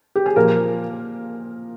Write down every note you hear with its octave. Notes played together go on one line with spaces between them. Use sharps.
G4
G#4
A#2 F3 A#3 A#4